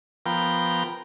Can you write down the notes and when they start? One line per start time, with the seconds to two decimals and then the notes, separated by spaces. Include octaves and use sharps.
0.26 F3 B3 A#4 G5